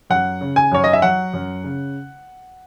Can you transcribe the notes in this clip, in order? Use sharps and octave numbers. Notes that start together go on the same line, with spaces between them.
F#2 F#5
C#3
G#5
F#2 C#5
D#5
E5
F#3 F#5
F#2
C#3